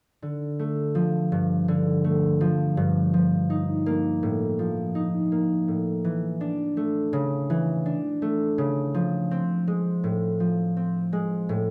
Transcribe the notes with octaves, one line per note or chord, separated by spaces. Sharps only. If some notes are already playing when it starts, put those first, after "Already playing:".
D3
A3
F3
G2
D3
A3
F3
G2
F3
D#4
A#3
A2
F3
D#4
A#3
A2
E3
D4
A3
C#3
E3
D4
A3
C#3
F3
C4
G#3
A2
F3
C4
G#3
A2